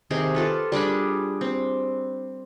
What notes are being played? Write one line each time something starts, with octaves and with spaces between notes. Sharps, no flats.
C3 D#3 G4 G#4
F4 A4 B4
G3 D4 G#4 B5
C4